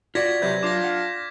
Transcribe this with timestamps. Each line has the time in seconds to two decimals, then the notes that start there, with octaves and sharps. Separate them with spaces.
0.15 F4 F#4 D5 G#6 A#6 B6
0.42 C3 F#3 B4 G6
0.63 D4 F4 D6 A#6
0.84 F#5